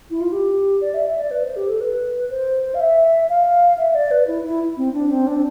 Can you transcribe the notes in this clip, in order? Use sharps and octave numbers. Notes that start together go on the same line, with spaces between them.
E4
F4
G4
D5
E5
E5
D5
B4
C5
G4
A4
B4
C5
F5
E5
F5
E5
D5
B4
E4
E4
C4
D4
C4
D4